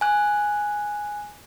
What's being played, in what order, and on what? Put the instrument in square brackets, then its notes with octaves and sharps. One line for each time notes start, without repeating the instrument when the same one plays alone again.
[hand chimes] G#5 F#6